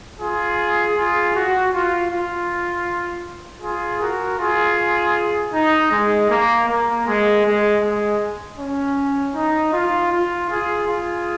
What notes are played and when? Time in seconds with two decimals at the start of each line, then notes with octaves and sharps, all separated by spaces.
0.19 F4 G#4
0.95 F4 G#4
1.34 F#4
1.72 F4
2.09 F4
3.62 F4 G#4
4.00 F#4 A#4
4.38 F4 G#4
5.52 D#4
5.91 G#3
6.29 A#3
6.67 A#3
7.05 G#3
7.44 G#3
7.81 G#3
8.58 C#4
9.34 D#4
9.72 F4
10.11 F4
10.49 F4 G#4
10.86 F4 G#4